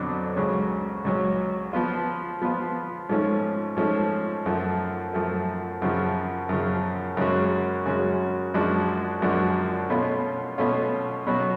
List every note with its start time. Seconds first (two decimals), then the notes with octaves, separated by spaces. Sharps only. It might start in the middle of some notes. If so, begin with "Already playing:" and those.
Already playing: F2 D3 F#3 B3 D4
0.36 C#2 C#3 F#3 C#4
1.05 C#2 C#3 F#3 C#4
1.73 F3 B3 F4
2.41 F3 B3 F4
3.09 G#2 F3 A3 C#4
3.76 G#2 F3 A3 C#4
4.46 F#2 F3 A3
5.13 F#2 F3 A3
5.82 F#2 C#3 F3
6.49 F#2 C#3 F3
7.17 F#2 C#3 G#3 C#4 F#4
7.86 F#2 C#3 G#3 C#4 F#4
8.54 F#2 F3 G#3 D4 F#4
9.22 F#2 F3 G#3 D4 F#4
9.90 B2 A3 C#4 F4
10.58 B2 A3 C#4 F4
11.27 B2 F#3 C#4 F#4